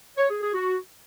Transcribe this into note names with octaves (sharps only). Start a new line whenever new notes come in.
C#5
G#4
G#4
F#4